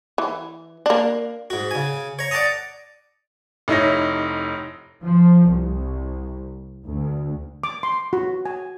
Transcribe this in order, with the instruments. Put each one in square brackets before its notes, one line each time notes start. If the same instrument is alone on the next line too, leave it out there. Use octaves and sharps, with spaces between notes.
[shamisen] E3
A#3 D4
[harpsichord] G#2 F#4
C#3 G#5
C#5 A#5
D5 F#5 A5 A#5 D#6
[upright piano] F1 D#4 E4 C#5 A#6
[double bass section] F3
C2
D2
[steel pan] D6
C6
F#4
G#5